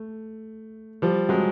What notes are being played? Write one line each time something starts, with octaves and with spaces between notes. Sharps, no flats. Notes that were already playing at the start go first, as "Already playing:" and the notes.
Already playing: A3
F3 G3
F#3 G#3